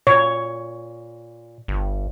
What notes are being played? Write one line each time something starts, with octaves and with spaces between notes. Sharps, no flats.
A#2 C#5
G1